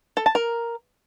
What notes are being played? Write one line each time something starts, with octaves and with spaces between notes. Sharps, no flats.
A4
A5
A#4